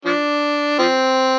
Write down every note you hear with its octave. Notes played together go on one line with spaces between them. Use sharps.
F3 D4
F3 C4